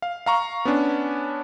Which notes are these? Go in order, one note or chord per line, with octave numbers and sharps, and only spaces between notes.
F5
F5 A#5 C#6
B3 C#4 D4